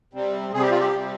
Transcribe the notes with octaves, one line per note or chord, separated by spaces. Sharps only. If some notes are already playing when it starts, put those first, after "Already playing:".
C3 G3 C4
C3 G3 C4 G#4
G4
F4
G4
C3 G3 C4